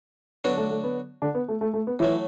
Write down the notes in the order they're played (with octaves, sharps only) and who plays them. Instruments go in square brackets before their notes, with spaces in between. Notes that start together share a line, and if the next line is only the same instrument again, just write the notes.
[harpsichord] D3 F#3 D4 F#4 [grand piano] B3
[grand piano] A3
A3
B3
D3 D4
B3
A3
A3
A3
B3
[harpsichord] A2 F#3 A3 [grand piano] E3 E4